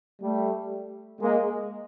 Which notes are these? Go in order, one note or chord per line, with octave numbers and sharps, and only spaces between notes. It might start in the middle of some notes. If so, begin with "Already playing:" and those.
G3 A3
G#3 A#3